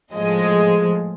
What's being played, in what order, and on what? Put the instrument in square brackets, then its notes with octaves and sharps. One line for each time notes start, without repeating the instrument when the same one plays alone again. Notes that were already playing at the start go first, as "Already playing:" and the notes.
[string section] A2 F3 G#3 D#5